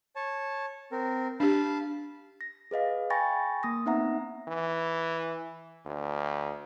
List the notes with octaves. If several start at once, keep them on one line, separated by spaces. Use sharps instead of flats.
C#5 A5
C4 A#4
D4 G4 F5 A5 B5
A#6
G#4 B4 D#5 F5
G5 G#5 B5 C#6 A6 A#6
A#3 D#6 A#6
B3 C4 D#4 E5 F#5 A#5
E3
D2